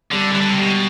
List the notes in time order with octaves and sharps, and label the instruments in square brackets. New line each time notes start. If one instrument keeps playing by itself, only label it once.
[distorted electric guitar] D3 [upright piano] G3
[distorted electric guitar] E3 [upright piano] G3
[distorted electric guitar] D3
C3
[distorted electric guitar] B2 [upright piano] G4